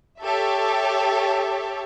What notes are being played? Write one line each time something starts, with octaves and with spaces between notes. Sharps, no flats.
G4 A4 C#5 E5